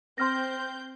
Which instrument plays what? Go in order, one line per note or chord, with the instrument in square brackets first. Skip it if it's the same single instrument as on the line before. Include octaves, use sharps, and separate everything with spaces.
[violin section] C4 G6 [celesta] C6 F6 A#6